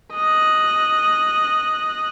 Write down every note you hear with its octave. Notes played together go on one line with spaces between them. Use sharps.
D#5 F#6